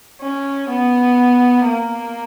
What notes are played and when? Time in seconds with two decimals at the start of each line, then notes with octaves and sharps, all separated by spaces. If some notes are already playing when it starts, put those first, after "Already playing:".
0.21 C#4
0.69 B3
1.65 A#3